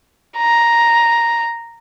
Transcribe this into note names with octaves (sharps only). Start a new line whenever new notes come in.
A#5